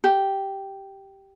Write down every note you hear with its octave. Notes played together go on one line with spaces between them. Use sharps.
G4